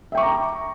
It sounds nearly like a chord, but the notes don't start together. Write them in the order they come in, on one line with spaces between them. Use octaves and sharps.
E5 G5 C#6 D6 A#5